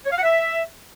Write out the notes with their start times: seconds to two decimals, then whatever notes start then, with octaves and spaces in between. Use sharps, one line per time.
0.05 C#5
0.11 F5
0.17 F#5
0.23 E5